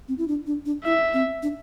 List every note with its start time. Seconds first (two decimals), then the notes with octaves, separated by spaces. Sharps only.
0.08 C4
0.18 E4
0.28 D4
0.47 D4
0.66 D4
0.84 E4 E5
1.14 C4
1.43 D4